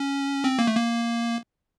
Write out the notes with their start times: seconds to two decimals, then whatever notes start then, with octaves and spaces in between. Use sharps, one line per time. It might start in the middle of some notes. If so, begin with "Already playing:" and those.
Already playing: C#4
0.44 C4
0.59 A#3
0.67 A3
0.76 A#3